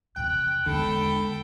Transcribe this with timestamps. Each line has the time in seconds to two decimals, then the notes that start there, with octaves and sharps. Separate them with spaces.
0.16 E2 C3 G5 F#6
0.66 E2 D3 G#3 A4 G5 B5